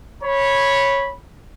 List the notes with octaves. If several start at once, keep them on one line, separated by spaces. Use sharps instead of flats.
C#5 B5